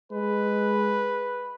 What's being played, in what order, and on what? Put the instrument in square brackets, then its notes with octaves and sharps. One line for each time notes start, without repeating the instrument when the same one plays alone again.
[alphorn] G#3 [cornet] B4